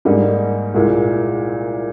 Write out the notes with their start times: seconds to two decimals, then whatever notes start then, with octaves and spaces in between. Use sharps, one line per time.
0.05 G#2 G3 A#3 D#4
0.74 C2 A#2 G#3